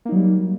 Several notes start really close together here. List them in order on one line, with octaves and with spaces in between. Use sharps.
A#3 D#4 F#3 G3